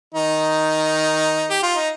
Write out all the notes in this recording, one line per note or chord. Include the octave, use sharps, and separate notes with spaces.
D#3 D#4
G4
F4
D#4